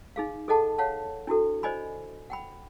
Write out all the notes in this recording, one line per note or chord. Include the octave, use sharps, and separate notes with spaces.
D#4 G#4 F5
G#4 A4 D#5 F#5 A5
C#5 F5 F#5 A5
D4 E4 F#4 A4
C5 D5 D#5 G#5 B5
F#5 G5 B5